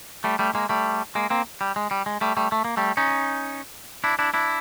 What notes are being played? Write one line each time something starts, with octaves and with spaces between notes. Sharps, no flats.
G3 A3
G3 A3
G#3 A#3
G3 A3
G#3 A#3
A#3 C4
G3
G#3
G3
G#3
G3 A3
G3 A3
A3
A#3
G3 A3
C#4 D#4
D4 E4
D4 E4
D4 E4